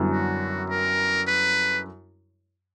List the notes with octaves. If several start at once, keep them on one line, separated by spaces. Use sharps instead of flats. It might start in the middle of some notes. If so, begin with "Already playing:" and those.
Already playing: F#2 D3 G3 B3 E4
F#4
A#4
B4